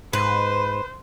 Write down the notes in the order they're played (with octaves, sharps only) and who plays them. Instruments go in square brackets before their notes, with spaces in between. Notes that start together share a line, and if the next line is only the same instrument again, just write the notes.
[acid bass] G#2 [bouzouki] B4 [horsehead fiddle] C5